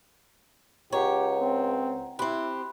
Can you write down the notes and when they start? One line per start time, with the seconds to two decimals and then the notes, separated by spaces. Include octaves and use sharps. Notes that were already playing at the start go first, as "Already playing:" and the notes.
0.92 C#2 G4 C#5 F#5 A#5
1.41 C4
2.19 C4 E4 G4 B5 C6 F#6